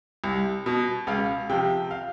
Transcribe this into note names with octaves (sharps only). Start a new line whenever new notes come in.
C2
B2
C#2 F5
C3 F3 G5
F5